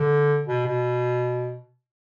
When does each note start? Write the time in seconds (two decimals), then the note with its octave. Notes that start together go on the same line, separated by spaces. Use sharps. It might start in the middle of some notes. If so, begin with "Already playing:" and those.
Already playing: D3
0.46 B2
0.66 B2